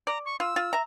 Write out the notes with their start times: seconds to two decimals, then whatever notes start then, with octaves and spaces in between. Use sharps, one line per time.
0.07 D5 A#5
0.25 C#6
0.40 F4 E6
0.56 F4
0.73 E5 A#5